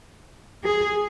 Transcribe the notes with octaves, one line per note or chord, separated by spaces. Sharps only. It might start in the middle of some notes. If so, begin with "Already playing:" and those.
G#4